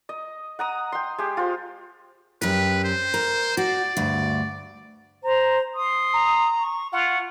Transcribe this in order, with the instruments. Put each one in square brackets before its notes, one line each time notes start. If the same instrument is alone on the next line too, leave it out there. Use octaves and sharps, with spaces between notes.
[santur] D#5
F#5 A#5 D#6
G5 C6
G#3 G4
F4 C5
[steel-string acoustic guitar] F#2 G4 A#4 [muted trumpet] B4
[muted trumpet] C5
[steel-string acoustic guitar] A#4
[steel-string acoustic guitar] F#4 [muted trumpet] D5
[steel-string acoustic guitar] D2 G2
[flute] C5 [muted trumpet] A#5
[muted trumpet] C6 [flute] D#6
[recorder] A#5
[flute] C#6
[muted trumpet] F4 [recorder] F#5 [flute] C#6